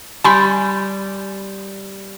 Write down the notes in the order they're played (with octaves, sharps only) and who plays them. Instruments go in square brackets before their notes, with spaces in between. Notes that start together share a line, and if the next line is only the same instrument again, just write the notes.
[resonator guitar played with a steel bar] G3 [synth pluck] G#5 B5 C6